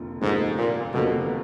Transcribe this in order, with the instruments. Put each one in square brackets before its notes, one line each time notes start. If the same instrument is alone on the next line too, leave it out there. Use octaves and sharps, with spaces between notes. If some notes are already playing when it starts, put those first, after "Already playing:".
Already playing: [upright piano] F1 D#2 D3 F3 A#3
[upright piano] F1 D#2 D3 F3 A#3 [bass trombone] G#2
[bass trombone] A#2
[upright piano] F1 D#2 D3 F3 A#3 [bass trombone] B2